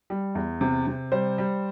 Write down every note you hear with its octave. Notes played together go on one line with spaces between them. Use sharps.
G3
E2
C3
C3
G3 C5
G3